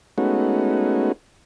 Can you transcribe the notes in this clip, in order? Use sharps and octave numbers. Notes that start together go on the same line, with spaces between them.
G#3 A3 B3 C#4 D#4 F#4